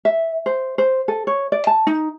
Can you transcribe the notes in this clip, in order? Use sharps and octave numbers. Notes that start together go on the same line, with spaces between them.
E5
C5
C5
A4
C#5
D5
A5
D#4